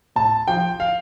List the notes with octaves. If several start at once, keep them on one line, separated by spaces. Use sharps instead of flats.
A2 A5
F3 G5
F5